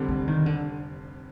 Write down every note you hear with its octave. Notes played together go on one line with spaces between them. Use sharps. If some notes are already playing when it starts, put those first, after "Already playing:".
Already playing: F1 F2 D3 G3
G#3
D#3
D3